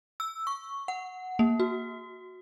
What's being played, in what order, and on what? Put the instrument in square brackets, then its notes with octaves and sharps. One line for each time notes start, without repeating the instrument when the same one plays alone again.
[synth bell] E6
C#6
F#5
A#3
F#4